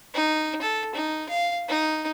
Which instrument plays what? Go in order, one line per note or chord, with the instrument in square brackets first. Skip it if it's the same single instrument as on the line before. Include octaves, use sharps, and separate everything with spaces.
[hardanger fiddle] D#4
A4
D#4
F5
D#4